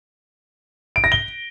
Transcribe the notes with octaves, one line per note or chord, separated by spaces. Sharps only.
D7
A#6
G7